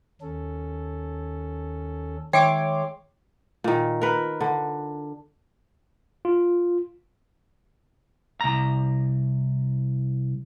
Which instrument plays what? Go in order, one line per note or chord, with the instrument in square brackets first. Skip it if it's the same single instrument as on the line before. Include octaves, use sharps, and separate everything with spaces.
[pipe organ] D#2 C#4 A4
[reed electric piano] D#3 E5 [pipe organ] G#3 [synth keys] C#5 C6 D6 [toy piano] G5
[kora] A#2 D#3
A#4 B4
D3
[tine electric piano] F4
[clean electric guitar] C2 A#5